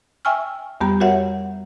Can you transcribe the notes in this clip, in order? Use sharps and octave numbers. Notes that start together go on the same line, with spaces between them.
E5 G5 G#5 C#6 E6 F6
F2 G3 B3 G4 A#5
F#4 G4 A#4 C#5 E5 F#5